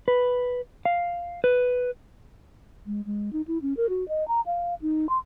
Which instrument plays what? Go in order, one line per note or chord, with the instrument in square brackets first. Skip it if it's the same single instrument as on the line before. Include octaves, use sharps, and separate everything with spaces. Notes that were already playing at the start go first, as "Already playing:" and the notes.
[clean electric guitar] B4
F5
B4
[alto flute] G#3
G#3
D#4
E4
C#4
A#4
F#4
D#5
A#5
F5
D#4
C6